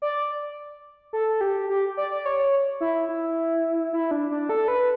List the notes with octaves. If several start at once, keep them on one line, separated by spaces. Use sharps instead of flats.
D5
A4
G4
G4
D5
D5
C#5
E4
E4
E4
D4
D4
A4
B4